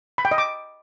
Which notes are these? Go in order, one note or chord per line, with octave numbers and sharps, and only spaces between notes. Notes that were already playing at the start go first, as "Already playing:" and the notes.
B5
G5
D#5
D6